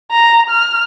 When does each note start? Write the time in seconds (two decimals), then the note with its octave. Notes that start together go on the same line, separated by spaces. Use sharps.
0.11 A#5
0.50 F6